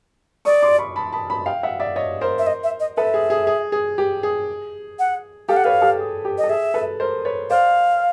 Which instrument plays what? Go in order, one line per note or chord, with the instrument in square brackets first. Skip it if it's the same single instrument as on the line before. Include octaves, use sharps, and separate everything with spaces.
[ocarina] D5 [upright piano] C#6 D#6
[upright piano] C6 D6
B5 C#6
A5 B5
A5 B5
A5 B5
F5 G5
E5 F#5
D5 E5
C#5 D#5
A#4 C5
[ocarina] E5
D#5
E5
D#5
[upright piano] A4 B4 [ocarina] E5
[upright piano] G#4
G#4
G#4
G#4
G4
G#4
[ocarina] F#5
[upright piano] G4 A4 [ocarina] F5
[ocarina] F#5
[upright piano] B4 C#5 [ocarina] F5
[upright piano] G4 A4
G#4
G4
[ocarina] D#5
[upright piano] A4
[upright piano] G#4 [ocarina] E5
[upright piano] A4 B4
A#4 C5
B4 C#5
[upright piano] C5 D5 [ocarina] F5